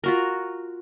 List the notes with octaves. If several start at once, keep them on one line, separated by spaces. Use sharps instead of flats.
F4 F#4 A#4